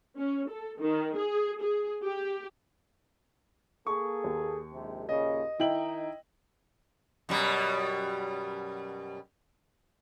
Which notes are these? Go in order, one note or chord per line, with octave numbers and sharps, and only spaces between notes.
C#4
A4
D#3
G#4
G#4
G4
A#3 G#4 A4 C#6
D#2
A#1 G#2 C3
A#2 C#3 D#5
D#3 D#4 E4 G5 F#7
F#2 B2 G3